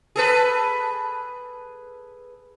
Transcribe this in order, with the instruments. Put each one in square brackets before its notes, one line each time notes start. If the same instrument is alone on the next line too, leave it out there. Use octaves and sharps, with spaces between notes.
[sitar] G#4 A4 B4